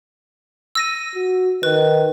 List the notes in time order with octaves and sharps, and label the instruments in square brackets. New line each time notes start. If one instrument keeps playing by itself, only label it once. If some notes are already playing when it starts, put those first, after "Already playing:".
[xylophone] E6 A#6 D#7
[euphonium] F#4
[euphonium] D#3 [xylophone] B4